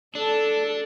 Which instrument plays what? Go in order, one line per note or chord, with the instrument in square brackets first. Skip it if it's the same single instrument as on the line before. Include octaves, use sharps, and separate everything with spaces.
[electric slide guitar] D4 [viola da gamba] A4